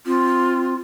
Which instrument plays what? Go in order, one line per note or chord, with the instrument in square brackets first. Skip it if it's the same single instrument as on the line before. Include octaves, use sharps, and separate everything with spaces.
[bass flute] C4 [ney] F4